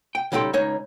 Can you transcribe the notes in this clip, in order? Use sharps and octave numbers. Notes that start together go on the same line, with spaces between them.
G5
C#3 G3 D#4 A4 G5 C6
C#2 D#4 C#5